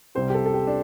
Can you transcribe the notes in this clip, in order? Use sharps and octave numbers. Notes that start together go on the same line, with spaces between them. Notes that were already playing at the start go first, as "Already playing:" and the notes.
C2 C3 G3 C5
G4
A4
A4
G4
D4